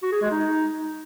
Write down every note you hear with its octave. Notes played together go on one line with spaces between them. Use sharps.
F#4
G#4
G#3
D#4